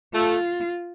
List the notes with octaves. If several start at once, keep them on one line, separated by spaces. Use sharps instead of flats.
A3 F4